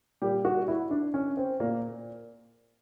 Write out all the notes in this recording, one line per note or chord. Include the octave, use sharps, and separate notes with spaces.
A#2 G3 G4
F#4
E4
D4
C#4
C4
A#2 A#3